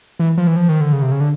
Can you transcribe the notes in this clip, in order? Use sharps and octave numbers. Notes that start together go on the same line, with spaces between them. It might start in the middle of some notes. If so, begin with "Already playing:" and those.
E3
F3
E3
F3
D#3
D3
C#3
C3
C#3
D3